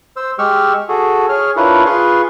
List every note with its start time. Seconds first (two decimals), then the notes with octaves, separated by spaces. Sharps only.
0.17 C5 E6
0.39 G#3 G4 C#6 E6 F6
0.89 F#4 G#4 A4
1.29 G#4 C#5 F6
1.57 D4 E4 F4 A#4 B4 C#5
1.86 F4 G#4 B4 C6 C#6